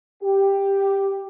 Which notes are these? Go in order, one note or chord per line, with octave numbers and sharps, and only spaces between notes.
G4